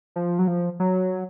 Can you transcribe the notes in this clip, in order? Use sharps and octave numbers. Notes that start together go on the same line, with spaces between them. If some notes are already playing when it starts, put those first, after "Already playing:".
F3
F#3
F3
F#3